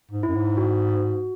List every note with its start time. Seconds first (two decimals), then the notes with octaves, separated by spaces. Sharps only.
0.11 G#2
0.23 F#2 E4
0.35 G#2
0.57 F#4